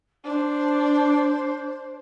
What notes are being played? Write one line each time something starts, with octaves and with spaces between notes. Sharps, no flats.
D4 C5